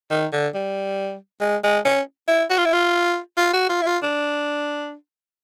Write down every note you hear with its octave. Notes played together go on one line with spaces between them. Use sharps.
D#3
D3
G3
G#3
G#3
C#4
E4
F#4
F4
E4
F4
F4
F#4
F4
E4
F4
D4